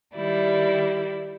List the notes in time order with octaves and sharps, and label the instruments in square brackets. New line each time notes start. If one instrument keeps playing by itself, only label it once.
[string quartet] D#3 G3 E4 D5